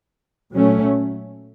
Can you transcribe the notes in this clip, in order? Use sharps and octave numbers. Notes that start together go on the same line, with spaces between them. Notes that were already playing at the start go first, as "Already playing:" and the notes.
A#2 F#3 A3 C#4